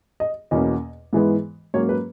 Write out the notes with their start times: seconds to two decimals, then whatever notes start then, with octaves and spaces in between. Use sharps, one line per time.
0.20 D#5
0.51 E2 B2 A#3 C#4 D#5
1.13 G#2 E3 G#3 B3
1.74 G#2 F#3 A#3 C#4 C#5
1.89 B4